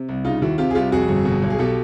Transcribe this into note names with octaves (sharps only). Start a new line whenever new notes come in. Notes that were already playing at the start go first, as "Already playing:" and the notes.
Already playing: C3
C2
C#3 D#4 F4
D#2 E4 F#4
C3 F4 G4
G#4
C2 F4 G4
F2 F#4 G#4
G1
B2
B1
G#4
B2 G4 A4